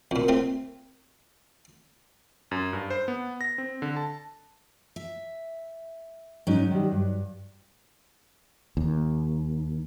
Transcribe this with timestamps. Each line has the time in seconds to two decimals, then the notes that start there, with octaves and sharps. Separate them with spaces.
0.11 F2 A#2
0.28 A3 C4 F4
2.51 F#2
2.73 G2
2.90 C5
3.08 B3
3.41 A#6
3.58 C4
3.82 D3
3.96 A5
4.96 E5
6.47 G#2 F#3 C#4 D#4
6.71 D#3 G3
6.92 G2
8.77 D#2